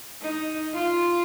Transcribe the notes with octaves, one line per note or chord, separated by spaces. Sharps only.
D#4
F4